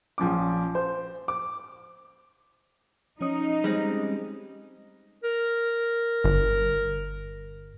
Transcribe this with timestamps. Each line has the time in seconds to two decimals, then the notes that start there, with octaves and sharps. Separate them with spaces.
0.18 A#1 F3 C#4 D6
0.75 C5
1.28 D6
3.21 F3 C#4 D#4 D#6
3.64 G3 G#3 C4
5.23 A#4
6.24 G1